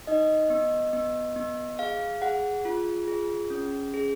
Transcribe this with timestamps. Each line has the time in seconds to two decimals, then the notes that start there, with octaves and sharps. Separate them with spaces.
0.07 D#4 D#5
0.50 B3
0.93 B3
1.36 B3
1.79 G#4 F5
2.22 G#4 F#5
2.65 F4
3.08 G#4
3.50 C#4
3.94 G#4